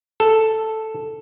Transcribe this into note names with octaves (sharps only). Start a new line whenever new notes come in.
A4